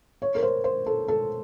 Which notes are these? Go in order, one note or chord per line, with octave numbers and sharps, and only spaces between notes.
C#5
A#4
C5
C5
A4
A4